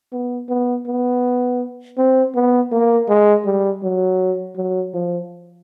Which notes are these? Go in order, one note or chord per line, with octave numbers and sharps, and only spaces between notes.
B3
B3
B3
C4
B3
A#3
G#3
G3
F#3
F#3
F3